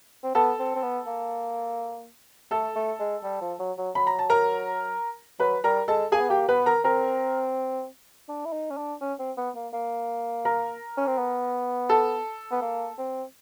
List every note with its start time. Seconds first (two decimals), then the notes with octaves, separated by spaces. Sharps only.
0.24 C4
0.35 B3 A4 A5
0.59 C4
0.75 C4
0.83 B3
1.07 A#3
2.51 A3 A4 A5
2.76 A3
3.00 G#3
3.24 G3
3.41 F3
3.60 F#3
3.78 F#3
3.95 F#3 B5
4.07 A#5
4.19 A5
4.30 A#4 A#5
5.40 F#3 B4 B5
5.64 G3 A#4 A#5
5.88 G#3 A4 A5
6.12 A#3 G#4 G#5
6.21 B3
6.30 A#3 G4 G5
6.48 B3 B4 B5
6.66 A#4 A#5
6.84 C4 A#4 A#5
8.29 D4
8.46 E4
8.53 D#4
8.70 C#4
8.77 D4
9.01 C#4
9.19 C4
9.37 B3
9.55 A#3
9.73 A#3
10.45 A#4 A#5
10.97 C#4
11.07 C4
11.18 B3
11.89 A4 A5
12.52 B3
12.62 A#3
12.98 C4